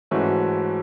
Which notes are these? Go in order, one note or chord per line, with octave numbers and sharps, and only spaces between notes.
G#2 E3 A3 C#4 F#4